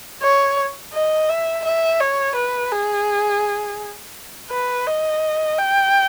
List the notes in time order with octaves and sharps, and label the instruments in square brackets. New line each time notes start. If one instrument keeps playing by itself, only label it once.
[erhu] C#5
D#5
E5
E5
C#5
B4
G#4
B4
D#5
G5